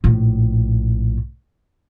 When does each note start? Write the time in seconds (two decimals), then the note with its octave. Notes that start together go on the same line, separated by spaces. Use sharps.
0.04 A#1 A2